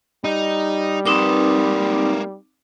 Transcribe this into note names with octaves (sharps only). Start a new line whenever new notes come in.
G3 D#4
A#3 C4 D#4 B4 D6